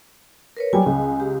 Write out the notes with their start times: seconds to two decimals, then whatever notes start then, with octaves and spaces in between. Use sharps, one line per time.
0.57 A#4 B4 C#5
0.73 F#3 G3 G#5
0.86 C#2
1.20 G4